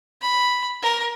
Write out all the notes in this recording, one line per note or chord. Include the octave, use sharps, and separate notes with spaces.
B5
A#4